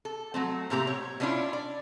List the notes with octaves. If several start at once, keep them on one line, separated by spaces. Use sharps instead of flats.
A4
F#3 A3 C4
A2 C3 A#3 C4 G4 A#5
C#5
B2 A3 C#4 D4 E4 F4
D5